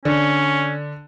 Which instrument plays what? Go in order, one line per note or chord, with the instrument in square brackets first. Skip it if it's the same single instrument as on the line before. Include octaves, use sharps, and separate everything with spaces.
[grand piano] D3 [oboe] C#4